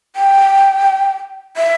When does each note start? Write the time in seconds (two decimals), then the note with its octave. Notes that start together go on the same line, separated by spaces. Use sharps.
0.16 G5
1.57 E5